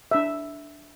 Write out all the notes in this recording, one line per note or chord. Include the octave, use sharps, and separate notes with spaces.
D4 E5